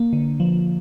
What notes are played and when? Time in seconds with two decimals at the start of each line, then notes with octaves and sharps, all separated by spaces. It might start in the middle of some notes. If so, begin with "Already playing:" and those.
Already playing: A#3
0.13 D3
0.40 F3